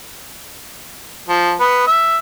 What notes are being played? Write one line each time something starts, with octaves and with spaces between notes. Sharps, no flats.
F3
B3
E5